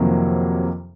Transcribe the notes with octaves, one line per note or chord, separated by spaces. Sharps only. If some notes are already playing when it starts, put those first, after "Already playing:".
Already playing: F2 C3 D#3 F#3 A#3